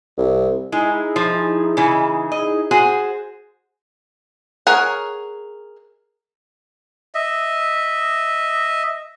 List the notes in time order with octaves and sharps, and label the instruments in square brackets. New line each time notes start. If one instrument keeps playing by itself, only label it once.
[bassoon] C2
[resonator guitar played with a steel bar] G#3 [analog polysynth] D#4 E4 G#4
[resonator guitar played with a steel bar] F3
C#3 E3
D#5
F#4 G#4 C5
[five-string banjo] G#4 A#4 C#5 F#5
[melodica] D#5 E5